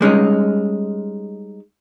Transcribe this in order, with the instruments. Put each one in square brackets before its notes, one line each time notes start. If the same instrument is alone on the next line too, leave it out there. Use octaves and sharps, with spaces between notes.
[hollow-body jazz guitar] G3 G#3 C#4 D#4